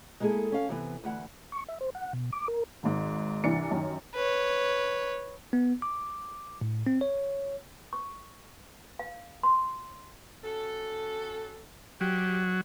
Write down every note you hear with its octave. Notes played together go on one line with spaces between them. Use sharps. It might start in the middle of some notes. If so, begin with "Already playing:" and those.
G#3 A#3 D#4 E4 G#4 A4
C#4 F5
C3 E3 B3
D2 E3 F#5
C#6
E5
C5
F#5
B2
D6
A#4
G#1 G#2
C2 E3 D4 C#7
F#2 D#3
B4 C#5
B3
D6
A2
C4
C#5
C#6
F5
C6
C#4 F#4 A4
F#3 G4